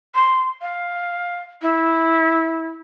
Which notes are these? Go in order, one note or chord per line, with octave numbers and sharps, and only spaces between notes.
C6
F5
E4